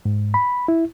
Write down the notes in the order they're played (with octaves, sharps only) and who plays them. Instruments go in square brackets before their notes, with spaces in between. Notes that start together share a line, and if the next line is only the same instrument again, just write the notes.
[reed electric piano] G#2
B5
E4